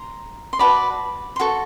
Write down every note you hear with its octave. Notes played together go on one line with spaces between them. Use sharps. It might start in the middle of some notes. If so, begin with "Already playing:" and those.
Already playing: A#5 C6
C6
F#4 B4 D5 A5 B5
C6
F#4 A4 C#6